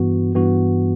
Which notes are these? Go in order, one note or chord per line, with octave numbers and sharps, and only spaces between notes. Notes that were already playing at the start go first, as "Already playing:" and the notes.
Already playing: G2 E3 B3 F#4
G2 E3 B3 F#4